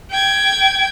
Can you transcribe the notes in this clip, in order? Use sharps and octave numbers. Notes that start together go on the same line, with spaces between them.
G5 G#6